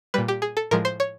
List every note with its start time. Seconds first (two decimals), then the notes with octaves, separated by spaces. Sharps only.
0.14 A#2 G3 B4
0.28 G4
0.42 G#4
0.57 A4
0.71 A2 F3 G#3 A#4
0.85 C5
1.00 C#5